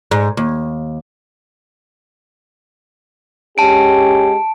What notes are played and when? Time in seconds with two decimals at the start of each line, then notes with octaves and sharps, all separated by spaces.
0.11 G#2
0.37 D#2
3.58 G#3 C#4 G4 A5 D7